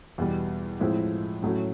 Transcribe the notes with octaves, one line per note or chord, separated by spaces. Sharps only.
E2 B2 G3
A2 F3 G#3 C4 E4
A2 F#3 A3 C#4